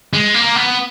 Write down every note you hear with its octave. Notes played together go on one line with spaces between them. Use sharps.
G#3
A#3
B3